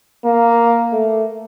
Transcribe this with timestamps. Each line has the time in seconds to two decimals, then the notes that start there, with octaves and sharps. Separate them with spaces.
0.24 A#3
0.92 A3